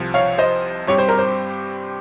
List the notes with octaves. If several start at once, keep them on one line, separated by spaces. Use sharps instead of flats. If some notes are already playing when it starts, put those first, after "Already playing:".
Already playing: C2 C3 F3
C#5 F5
C5 D#5
G2 G3 C4 G4 C#5
C5
A#4
C5